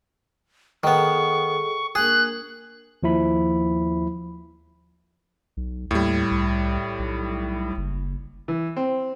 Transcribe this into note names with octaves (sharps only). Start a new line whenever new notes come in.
D#3 B3 G#4 A4 C#6
A#3 D4 G#4 A#4 F#6
D#2 F3 E4 B5
B1
D#2 A2 G3
C2
B1
F#1
E3
C4